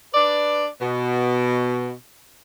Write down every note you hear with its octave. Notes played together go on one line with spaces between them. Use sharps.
D4 B4 D5
B2